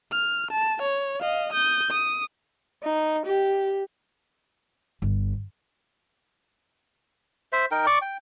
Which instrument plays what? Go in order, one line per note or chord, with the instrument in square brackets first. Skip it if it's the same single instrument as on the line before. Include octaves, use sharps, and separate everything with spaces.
[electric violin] F6
A5
C#5
D#5 F5
D#6 G6
D#6
[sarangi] D#4
G4
[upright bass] G1
[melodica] C5 E5
D#4 A#4 G5
D5 C#6 D6
G5